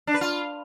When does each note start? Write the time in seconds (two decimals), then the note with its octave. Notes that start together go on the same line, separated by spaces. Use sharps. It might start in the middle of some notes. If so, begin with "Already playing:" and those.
0.07 D4
0.14 B4
0.21 F4